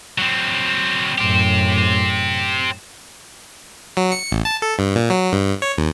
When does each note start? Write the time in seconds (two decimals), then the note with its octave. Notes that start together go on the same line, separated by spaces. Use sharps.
0.18 F#3 C4
1.18 F#2 A2 C4 G4
3.97 F#3
4.12 C#7
4.32 A1
4.45 A5
4.62 A4
4.79 G2
4.95 A#2
5.10 F#3
5.33 G2
5.62 C#5
5.78 D#2